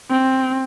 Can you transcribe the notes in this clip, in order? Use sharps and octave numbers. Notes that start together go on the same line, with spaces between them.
C4